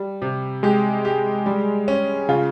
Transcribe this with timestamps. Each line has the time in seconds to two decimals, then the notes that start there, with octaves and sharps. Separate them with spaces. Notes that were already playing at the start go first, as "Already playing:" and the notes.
Already playing: G3
0.22 C3
0.63 G#3 G4
1.05 G4
1.46 G3
1.88 C#4
2.29 C#3 F4